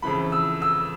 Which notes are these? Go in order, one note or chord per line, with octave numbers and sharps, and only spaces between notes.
F2 C#3 E3 B5
E6
E6